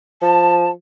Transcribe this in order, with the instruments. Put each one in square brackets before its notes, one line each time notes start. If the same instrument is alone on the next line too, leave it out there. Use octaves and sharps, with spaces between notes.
[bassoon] F3 [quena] A5